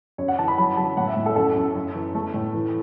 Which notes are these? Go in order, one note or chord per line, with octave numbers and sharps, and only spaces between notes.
F#2 C#5
F#5
E3 A5
B5
F#3 B5
F#3 A5
A2 F#5
E5
A2
A4
F#2 A4
F#2
F#2
E3
A3
A2
E3